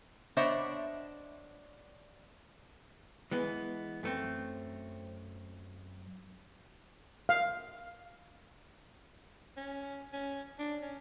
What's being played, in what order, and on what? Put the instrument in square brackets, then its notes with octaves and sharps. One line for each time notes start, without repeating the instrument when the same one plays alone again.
[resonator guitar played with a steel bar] B3 D4 C5 C#5 D#5 E5
[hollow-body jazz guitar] E3 G#3 B3
F#2 A3 C4
[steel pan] F5
[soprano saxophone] C#4
C#4
D4
C#4